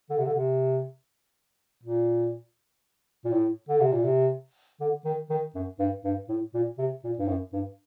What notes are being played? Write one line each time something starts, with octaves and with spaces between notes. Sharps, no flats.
D3
C3
D3
C3
A#2
A#2
A2
D3
C3
A#2
C3
D3
D#3
D#3
F#2
G2
G2
A2
A#2
C3
A#2
G2
F#2
G2